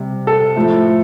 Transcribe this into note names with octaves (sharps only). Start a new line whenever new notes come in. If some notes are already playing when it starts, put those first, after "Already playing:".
Already playing: C3 G3
A4
A2 F3 A3